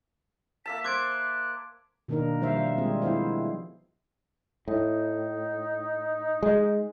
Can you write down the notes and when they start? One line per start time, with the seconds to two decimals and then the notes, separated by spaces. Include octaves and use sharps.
0.66 A#3 E5 A5 B6
0.84 C5 D6 F#6 G#6 D7
2.08 B2 D#3 A#3 D4 D#4 A#4
2.41 D#3 F3 G3 C5 E5 F5
2.78 F3 G3 G#3 C4 F4 G#4
3.02 F3 B3 E4 C5 F5
4.68 A2 D#4
6.43 G#3